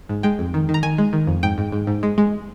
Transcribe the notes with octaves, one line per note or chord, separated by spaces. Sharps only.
G#2
G#3 G5
F2
D#3
D#3
A#5
D#3 G#5
G#3
D#3
F2
G#2 G5
G#2
G#2
G#2
G#3
G#3